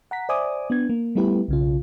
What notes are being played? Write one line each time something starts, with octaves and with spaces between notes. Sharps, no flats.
F#5 A#5 B6
C5 D5 E5 G#5 D6 D#6
B3 D4 G#6
A#3
G3 A3 B3 E4 G4 B4
B1 C#3 F4